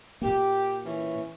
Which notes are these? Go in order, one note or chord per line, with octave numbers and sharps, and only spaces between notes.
A#2 A#3 G4
E3 C#4